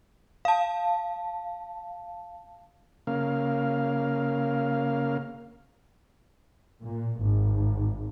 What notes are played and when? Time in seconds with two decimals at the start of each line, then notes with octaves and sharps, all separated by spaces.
0.45 F5 A5
3.07 C#3 A#3 F5
6.83 A#2
7.24 G#1